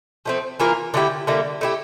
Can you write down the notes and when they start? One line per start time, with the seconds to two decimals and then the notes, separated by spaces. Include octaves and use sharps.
0.26 F3 A3 C4
0.60 E3 A#3 F4 A#4
0.94 D3 A3 E4 G4
1.27 D3 G3 A#3 E4
1.61 A3 E4 G4